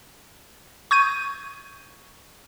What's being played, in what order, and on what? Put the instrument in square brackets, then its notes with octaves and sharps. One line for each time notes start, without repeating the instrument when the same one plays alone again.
[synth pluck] C#6 D#6 G6 G#6 D#7